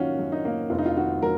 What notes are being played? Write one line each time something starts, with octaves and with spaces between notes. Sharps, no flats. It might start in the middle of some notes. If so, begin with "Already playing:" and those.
Already playing: F#2 D#3 A#3 C#4 F4 F#4
F#2
D#4
A#3
F1 F4
D#4
F4
D#3 F#4
F#3 A#4